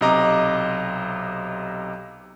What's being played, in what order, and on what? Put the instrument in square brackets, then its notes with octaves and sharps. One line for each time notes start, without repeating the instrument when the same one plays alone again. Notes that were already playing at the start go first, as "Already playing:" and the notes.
[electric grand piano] B1 C3 D#5 A#5 D6